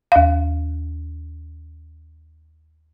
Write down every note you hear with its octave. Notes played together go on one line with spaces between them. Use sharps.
D#2 F5